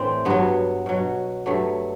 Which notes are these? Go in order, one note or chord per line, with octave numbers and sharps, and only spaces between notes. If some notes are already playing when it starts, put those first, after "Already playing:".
Already playing: A2 E3 G3 C4 D4
G2 F#3 B3
B2 F#3
G2 F#3 A3